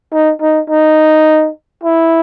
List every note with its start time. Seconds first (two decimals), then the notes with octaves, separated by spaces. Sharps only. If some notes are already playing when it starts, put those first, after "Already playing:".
0.12 D#4
0.41 D#4
0.70 D#4
1.83 E4